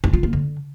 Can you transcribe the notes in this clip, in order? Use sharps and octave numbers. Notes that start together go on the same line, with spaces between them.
D#4
F4
A#3
D3